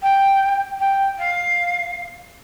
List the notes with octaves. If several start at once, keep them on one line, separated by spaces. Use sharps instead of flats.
G5
G5
F5